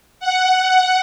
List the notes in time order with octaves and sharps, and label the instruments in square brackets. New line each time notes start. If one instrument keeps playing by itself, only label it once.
[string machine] F#5